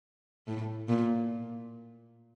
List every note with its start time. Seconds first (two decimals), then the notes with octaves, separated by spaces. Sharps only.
0.48 A2
0.89 A#2